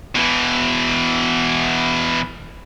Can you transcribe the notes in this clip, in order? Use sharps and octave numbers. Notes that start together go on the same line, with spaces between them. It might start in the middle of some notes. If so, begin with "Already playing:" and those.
B2 E3